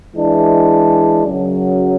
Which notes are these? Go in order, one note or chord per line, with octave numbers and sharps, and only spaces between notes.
E3 G#3 D4
F#2 C#3 F#3